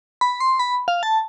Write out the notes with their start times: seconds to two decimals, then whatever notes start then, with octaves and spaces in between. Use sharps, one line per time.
0.21 B5
0.40 C6
0.59 B5
0.88 F5
1.03 A5